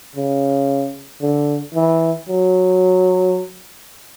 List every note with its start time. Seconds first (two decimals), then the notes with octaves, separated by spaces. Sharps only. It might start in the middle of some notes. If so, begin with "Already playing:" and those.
0.16 C#3
1.21 D3
1.75 E3
2.29 F#3